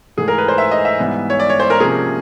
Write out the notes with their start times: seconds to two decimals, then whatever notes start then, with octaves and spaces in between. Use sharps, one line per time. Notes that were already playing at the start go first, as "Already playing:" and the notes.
0.17 G#2 E3 A3 G#4
0.28 A#4
0.38 B4
0.48 C5
0.58 E5
0.71 D#5
0.85 E5
0.99 G#2 E3 G3 B3
1.30 C#5
1.40 D5
1.50 C#5
1.60 C5
1.70 A#4
1.80 C3 F3 A#3 C#4 G#4